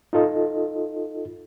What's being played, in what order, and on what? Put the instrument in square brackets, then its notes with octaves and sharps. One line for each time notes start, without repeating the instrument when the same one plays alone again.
[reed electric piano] D#4 F4 A4 D#5